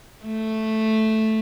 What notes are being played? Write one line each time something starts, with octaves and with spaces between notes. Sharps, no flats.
A3